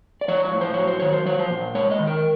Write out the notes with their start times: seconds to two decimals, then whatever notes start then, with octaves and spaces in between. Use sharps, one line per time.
0.21 D5
0.28 F3 C#5
0.45 C#5
0.52 A2
0.61 C5
0.74 F#3 C#5
0.87 C5
1.00 D#3 C#5
1.13 C5
1.26 F3 C#5
1.39 C5
1.51 A#2
1.75 G#3 C#5
1.91 D#5
1.99 D#3
2.07 A#4